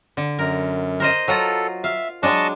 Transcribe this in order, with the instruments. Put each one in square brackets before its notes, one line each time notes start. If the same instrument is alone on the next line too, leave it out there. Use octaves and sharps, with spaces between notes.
[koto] D3
[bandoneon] F#2 [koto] A#4
[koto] A#4 C5 D#5
[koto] F#3 F4 A#5 [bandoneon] A4
[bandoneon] E5 [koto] F5
[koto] F#3 G#3 D4 [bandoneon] D#5 A5 C#6